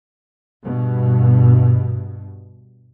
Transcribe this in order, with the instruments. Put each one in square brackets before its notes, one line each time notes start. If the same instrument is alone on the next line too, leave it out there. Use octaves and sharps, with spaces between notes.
[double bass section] G2 B2